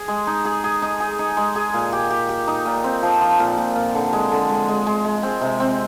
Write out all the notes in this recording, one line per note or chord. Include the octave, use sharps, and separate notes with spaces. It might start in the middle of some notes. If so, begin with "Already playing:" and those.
Already playing: G#4
G#3
D#4
G#4
G#4
D#4
G#4
D#4
G#3
G#4
A#2
G4
G4
G4
D#4
A#2
C4
F3
F3
A#2
A#2
A#2
D3
G#3
D3
G#3
G#3
G#3
G#3
C4
C3
C4